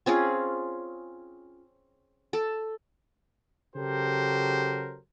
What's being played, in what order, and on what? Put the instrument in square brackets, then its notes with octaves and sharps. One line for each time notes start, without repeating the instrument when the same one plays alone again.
[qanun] C4 C#4 F4 G#4
A4
[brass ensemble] C#3 F#3 G4 A4 A#4 C5